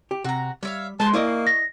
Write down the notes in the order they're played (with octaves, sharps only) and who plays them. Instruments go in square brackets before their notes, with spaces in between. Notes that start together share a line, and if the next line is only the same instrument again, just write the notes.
[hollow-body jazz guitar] G4
[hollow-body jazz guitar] C3 [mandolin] F#4 A#5
[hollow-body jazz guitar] G3 [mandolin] C#5 E5 F5
[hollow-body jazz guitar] G#3 [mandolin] B4 C5 C6 [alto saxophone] A5
[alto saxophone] A#3 [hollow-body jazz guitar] E4 D5 D#5 [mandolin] G#4 C#6 D#6
[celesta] A#6